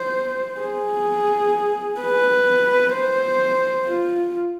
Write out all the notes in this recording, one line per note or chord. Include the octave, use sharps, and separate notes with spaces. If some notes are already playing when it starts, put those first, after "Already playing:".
Already playing: C5
G#4
B4
C5
F4